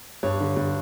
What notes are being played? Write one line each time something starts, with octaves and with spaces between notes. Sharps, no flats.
G2 C#5
D3
G2